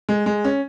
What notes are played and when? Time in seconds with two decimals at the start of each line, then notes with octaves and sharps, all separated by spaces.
0.09 G#3
0.26 G#3
0.44 C#4